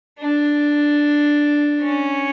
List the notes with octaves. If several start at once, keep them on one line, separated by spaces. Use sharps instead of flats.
D4
C#4